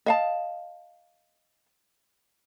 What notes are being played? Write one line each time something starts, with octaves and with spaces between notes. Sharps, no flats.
D#5 F5 A5